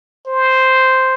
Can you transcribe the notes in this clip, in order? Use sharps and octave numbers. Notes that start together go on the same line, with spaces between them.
C5